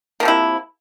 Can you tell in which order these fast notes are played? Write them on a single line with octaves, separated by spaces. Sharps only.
A#3 F3 C3 E4